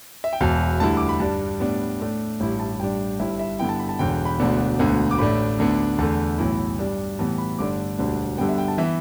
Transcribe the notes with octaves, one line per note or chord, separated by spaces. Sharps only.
E5
G5
E1 E2 B2 A5
D2 D3 G3 E4 A5
D6
B5
G2 G3 D4 A5
A2 G3 B3 D4
A2 A3 D4
A1 G2 G3 E4
A5
A1 G2 G3 D4 G5
G1 G2 G3 E4 E5
E5
G2 D3 B3 E4 G5
A5
B5
A5
E1 E2 D3 G5
B5
E1 D2 D3 B3 D4
E1 D2 D3 B3
D6
A1 A2 A3 D4 B5
D2 D3 B3 D4
E2 D3 A3 A5
B1 A2 E3 B3 E4
G2 G3 D4
A2 E3 G3 B3 A5
B5
G1 G2 D3 A3 D4 D6
E1 D2 D3 G3 D4
G2 D3 G3 B3 G5
E5
G5
A5
E3 B3 E5